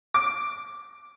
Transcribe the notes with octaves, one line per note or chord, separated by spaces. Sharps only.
D6